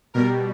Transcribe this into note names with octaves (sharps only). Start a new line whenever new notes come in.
B2 G3 A#4